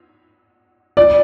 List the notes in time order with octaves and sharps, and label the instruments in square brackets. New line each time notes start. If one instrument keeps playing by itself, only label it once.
[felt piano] D5